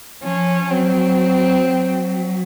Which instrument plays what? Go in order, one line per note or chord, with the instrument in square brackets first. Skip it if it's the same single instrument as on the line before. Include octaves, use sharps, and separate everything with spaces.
[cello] F3 [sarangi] C#4
[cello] F#3 [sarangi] C4
[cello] F#3